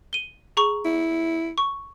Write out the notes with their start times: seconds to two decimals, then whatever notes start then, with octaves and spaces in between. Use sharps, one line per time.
0.13 D#7 G7
0.57 G#4 A#5 C#6
0.85 E4
1.58 C#6